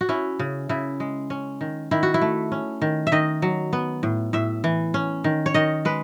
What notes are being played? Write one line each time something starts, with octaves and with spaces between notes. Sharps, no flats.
F#4
C#4 E4
C#3
C#3 E4
G#3
C#4
D#3
D#3 E4
F#4
E4
A3
C#4
D#3
E5
D#3 D#5
F#3
B3
A2
A2 E5
E3
C#4
D#3
C#5
D#3 D#5
G#3 B4